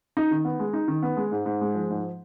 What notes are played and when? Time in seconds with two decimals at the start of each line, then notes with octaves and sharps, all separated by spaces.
0.17 D#4
0.31 D#3
0.45 B3
0.59 G#3
0.73 D#4
0.88 D#3
1.03 B3
1.17 G#3
1.32 G#2
1.46 G#2
1.61 G#3
1.75 F3
1.90 G#2